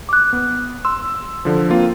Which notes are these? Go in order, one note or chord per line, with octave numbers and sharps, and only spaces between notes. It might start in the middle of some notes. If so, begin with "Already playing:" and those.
D6 F#6
B3
C6 E6
D3 F3
A#3 C4 F4